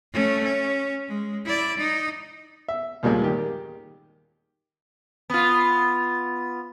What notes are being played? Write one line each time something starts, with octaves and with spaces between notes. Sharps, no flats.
A3 C#4
C#4
G#3
E4 D5
D#4
E5
D#2 A#2 G3 G#3
D#3 G4
B3 F4